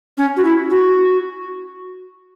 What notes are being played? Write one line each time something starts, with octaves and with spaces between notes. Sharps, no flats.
C#4
F#4
E4
F#4